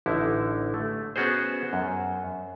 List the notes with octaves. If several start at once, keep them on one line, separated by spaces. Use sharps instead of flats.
A1 D3 D#4 E4
A3
B3 C#4 F#4 G#4 C5
F#2